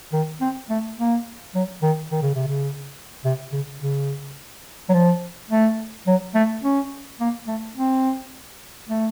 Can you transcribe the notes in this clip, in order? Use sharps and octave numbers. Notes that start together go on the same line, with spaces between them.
D#3
C4
A3
A#3
F#3
D#3
D#3
C#3
C3
C#3
C3
C#3
C#3
F#3
F3
A3
F#3
A3
C#4
A#3
A3
C4
A3